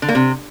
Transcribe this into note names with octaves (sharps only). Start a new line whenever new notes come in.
D3
A#3
C3